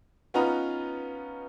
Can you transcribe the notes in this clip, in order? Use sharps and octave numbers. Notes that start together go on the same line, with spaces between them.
B3 C#4 D#4 F4 B4 A#5